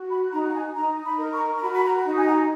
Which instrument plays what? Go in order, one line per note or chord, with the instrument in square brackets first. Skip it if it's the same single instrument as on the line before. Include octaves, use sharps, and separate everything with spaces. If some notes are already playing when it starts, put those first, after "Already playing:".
Already playing: [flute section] F#4
B5
D#4 A#5
F#5
G#5
D#4 A#5
B5
A#4
C#6
A#5
F#4 B5
B5
A#5
D#4
G#5
A#5